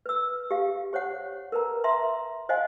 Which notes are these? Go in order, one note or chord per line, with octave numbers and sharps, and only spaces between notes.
B4 E6
G4 F5
G4 C5 C#5 F#5
A#4 B4 A#5
E5 A#5 C6
C5 D#5 F5 F#5 G#5